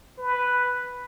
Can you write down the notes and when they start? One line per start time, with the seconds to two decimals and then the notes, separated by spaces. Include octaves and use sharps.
0.18 B4